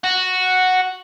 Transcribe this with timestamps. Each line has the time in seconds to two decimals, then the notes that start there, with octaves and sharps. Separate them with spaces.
0.04 F#4